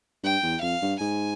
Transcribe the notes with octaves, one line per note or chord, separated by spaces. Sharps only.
G2 G5
E2
F2 F5
G2
G#2 G#5